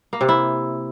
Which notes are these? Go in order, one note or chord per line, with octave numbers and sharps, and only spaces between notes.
A#3
C3
E4